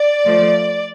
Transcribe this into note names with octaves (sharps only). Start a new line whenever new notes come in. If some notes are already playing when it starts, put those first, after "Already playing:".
Already playing: D5
F3 A3